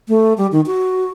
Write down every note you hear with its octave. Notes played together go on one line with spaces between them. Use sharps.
A3
G3
D#3
F#4